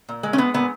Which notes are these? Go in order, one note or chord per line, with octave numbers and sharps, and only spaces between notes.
A#2
G#3
C#4
G#3 B3
A#2 B3